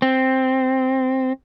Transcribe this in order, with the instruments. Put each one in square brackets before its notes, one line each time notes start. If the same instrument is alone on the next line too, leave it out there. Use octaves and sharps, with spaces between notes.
[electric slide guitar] C4